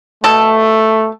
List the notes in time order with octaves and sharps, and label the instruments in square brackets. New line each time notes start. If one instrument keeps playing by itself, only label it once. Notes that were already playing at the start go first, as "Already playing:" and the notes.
[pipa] B2 A4 [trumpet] A3